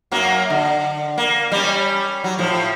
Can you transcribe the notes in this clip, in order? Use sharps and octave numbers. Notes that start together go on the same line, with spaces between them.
F#2 F#3 A#3
D3
A#3
G3 C#4
F#3
A2 F3